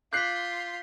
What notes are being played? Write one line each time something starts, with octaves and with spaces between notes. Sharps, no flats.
F4 C6 D6 F#6 G6 B6 C7